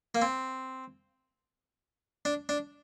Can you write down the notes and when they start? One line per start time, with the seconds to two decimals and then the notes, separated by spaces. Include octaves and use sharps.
0.15 A#3
0.22 C4
2.25 D4
2.49 D4